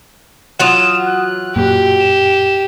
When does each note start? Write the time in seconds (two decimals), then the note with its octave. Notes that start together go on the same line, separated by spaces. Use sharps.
0.59 E3 F#3 F4 F#5 D#6 E7
1.06 F#6
1.56 F#2 A#2 G4
2.00 E7